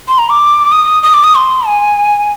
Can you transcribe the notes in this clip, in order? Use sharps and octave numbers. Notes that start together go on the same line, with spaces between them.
C6
A#5
D6
D#6
D#6
D6
D#6
C6
G#5